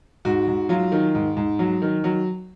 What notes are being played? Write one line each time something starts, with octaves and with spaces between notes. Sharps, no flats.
G#2 F#4
G#2
F#3 F4
D#3
G#2
G#2
F#3
D#3
F#3